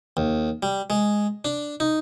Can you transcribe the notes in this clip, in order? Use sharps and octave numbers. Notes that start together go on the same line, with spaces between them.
D#2
G3
G#3
D4
D#4